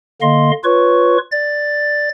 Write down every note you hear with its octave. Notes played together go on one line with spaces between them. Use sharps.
D3 A#3 D#5 F5 C6
F4 B4 C#5 C#6
D5 A6